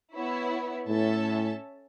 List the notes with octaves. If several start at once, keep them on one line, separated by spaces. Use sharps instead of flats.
B3 E4 C#5
A2 C#4 A4 E5 A5